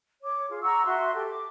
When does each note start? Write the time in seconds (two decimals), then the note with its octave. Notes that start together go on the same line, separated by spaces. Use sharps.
0.23 C#5 D6
0.49 F4 G#4
0.62 F#5 A#5 C#6 E6
0.85 F#4 E5 C6
1.14 G4 A4
1.30 D6